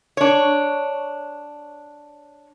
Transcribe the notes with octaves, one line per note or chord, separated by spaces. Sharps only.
D4 C#5